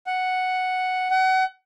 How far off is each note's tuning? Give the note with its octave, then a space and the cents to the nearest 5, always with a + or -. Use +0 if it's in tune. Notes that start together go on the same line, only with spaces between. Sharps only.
F#5 +0
F#5 +30